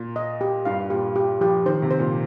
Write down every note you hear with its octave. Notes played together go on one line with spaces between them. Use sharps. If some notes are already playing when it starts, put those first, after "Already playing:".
Already playing: A#2
D#5
G4
G2 F5
A#2 G4
G4
F3 G4
D#3 C5
C3
C5
A#2